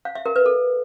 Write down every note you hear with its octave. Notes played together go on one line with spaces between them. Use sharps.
F5
E5
A#4
B4
A4